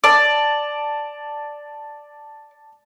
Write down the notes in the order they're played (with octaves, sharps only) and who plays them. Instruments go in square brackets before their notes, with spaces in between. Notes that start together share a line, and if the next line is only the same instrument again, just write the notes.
[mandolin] D5 [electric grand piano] A5 D6